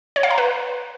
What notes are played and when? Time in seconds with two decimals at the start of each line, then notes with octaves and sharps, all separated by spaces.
0.16 C#5
0.23 F5
0.30 A#5
0.38 B4